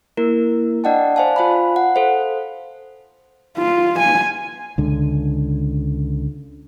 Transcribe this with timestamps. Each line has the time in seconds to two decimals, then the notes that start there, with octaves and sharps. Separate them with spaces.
0.17 A#3 E4 A#4
0.84 D4 D5 D#5 F#5 G5 A5
1.16 C5 D5 F5 G#5 A5
1.36 F4 C5 F5 G#5 B5
1.76 F#5
1.95 A4 C5 F5
3.57 F4
3.99 G#5
4.78 C#2 D3